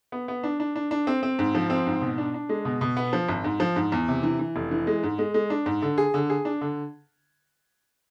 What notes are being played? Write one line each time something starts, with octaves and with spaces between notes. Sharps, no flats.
B3
B3
D4
D4
D4
D4
C4
C4
G#2
F3
C4
G#2
B2
D4
D4
G#3
B2
B2
B3
F3
G#1
G#2
F3
G#2
E2
C3
E3
E3
F1
E3
G#3
G#2
G#3
G#3
D4
G#2
D3
G#4
D3
G#4
D4
D3